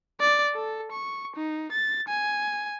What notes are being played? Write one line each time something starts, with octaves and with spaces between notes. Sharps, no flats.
D5
A4
C#6
D#4
A6
G#5